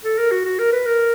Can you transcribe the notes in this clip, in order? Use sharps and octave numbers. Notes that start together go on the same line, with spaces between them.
A4
A#4
F#4
F#4
A#4
B4
A#4